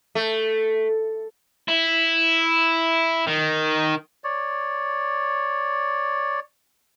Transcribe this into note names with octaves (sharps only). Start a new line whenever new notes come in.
A3
E4
D#3
C#5 D5